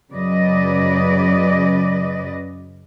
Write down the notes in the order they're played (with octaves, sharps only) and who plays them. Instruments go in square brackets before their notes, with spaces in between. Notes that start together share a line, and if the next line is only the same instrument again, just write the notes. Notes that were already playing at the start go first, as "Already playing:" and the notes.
[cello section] F#2 C#3 F#3 B4 D5 D#5